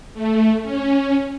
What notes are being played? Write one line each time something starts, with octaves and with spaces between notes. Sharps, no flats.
A3
C#4